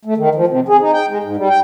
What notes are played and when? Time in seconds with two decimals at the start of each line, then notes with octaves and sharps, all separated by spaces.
0.05 A3
0.17 D#3
0.35 F3
0.47 C3
0.68 G#4
0.81 D#4
0.93 G5
1.09 G#3
1.23 G#2
1.37 G3
1.50 G5